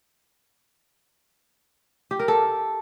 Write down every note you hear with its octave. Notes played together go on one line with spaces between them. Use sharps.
G4
A#4
A4